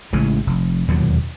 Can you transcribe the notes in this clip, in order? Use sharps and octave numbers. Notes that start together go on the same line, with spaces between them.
A1 C#3 E3 G#3
F1
E1 D#2 A#2 F#3